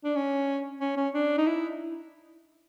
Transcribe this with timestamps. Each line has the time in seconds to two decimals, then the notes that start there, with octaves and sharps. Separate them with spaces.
0.04 D4
0.16 C#4
0.81 C#4
0.97 C#4
1.14 D4
1.38 D#4
1.47 E4